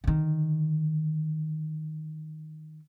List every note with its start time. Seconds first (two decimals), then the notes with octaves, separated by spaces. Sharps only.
0.04 D3 D#3